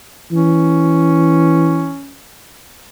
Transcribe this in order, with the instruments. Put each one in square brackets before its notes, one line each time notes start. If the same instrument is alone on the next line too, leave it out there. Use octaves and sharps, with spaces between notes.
[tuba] E3 [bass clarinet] C#4